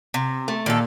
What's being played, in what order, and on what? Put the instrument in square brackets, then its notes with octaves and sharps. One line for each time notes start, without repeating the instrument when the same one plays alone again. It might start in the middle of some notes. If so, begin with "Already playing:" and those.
[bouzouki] C3
[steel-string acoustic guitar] A3
[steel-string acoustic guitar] A#2 [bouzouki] D#3 A4